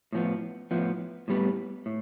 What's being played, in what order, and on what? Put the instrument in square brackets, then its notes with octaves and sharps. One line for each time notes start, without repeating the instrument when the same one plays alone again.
[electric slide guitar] A2 F3 B3
A2 F3 B3
A2 G3 B3
A2